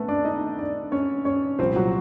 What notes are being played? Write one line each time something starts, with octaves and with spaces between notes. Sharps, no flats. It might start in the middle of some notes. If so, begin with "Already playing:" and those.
Already playing: A3 B3 C#4 A4 B4
D4 D5
D#4 D#5
D4 D5
C#4 C#5
C#4 C#5
C2 A#2 F3 C4 C5
F#3 F#4